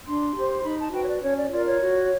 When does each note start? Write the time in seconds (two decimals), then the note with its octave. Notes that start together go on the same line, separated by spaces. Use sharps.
0.06 D4 C6
0.35 G4 C5
0.57 C6
0.64 D#4 B5
0.79 A5
0.93 F#4 B4 G5
1.03 C#5
1.07 D5
1.22 C#4 C#5
1.36 D5
1.51 F4 A#4 D5
1.66 C#5
1.80 F#4